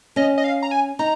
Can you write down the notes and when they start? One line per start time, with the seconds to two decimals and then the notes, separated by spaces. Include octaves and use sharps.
0.16 C#4 D#5
0.38 D#5
0.44 F5
0.63 A#5
0.71 G#5
0.99 D#4 A#5